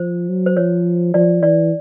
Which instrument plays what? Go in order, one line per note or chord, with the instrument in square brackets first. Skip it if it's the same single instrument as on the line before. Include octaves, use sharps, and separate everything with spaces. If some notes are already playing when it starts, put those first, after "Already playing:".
Already playing: [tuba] F3 [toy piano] C5
[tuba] F#3
[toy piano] C5
[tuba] F3 [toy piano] C#5
[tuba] F3 [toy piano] D5
[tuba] E3 [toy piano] D5